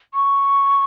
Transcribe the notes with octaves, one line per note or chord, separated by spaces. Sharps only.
C#6